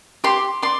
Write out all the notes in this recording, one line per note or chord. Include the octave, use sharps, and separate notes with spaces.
G4 C6
D5 C6